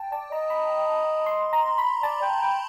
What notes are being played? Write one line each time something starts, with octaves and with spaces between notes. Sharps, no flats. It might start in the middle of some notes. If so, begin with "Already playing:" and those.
Already playing: G5 A5
D5 A5
D#5 A#5
B5
C6
A#5
B5
D5 A5
G5
G5